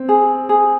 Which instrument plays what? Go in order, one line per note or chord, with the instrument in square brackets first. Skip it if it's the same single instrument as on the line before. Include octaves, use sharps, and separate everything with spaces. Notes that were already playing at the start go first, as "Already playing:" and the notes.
Already playing: [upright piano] C4
[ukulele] G#4
G#4